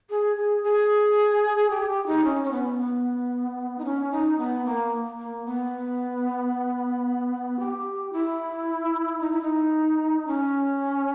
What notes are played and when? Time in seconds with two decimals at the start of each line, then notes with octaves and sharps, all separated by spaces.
0.10 G#4
0.37 G#4
0.63 G#4
1.70 G4
1.89 G4
2.06 D#4
2.24 C#4
2.43 C#4
2.51 B3
2.78 B3
3.78 D#4
3.85 C#4
4.11 D#4
4.38 B3
4.65 A#3
5.19 A#3
5.46 B3
7.59 G4
8.13 E4
9.20 D#4
9.31 E4
9.42 D#4
10.27 C#4